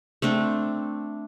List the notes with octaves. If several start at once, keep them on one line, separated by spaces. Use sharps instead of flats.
A3 C4 D4